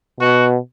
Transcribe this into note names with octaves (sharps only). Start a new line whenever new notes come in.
B2 F#4